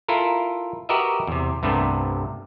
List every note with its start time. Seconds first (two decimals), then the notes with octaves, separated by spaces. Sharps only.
0.08 E4 F4 A4 A#4
0.89 F#4 G4 A#4 B4 D#5 E5
1.27 E2 C3
1.63 C2 G2 C3 A3 B3